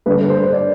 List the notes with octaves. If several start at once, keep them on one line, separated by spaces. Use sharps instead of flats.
G2 D3 G3 D4 B4
C5
D5